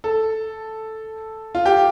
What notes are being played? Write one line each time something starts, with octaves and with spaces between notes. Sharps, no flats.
A4
F4
G4